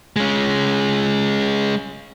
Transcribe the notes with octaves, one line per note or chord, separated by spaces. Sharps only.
G#3 C#4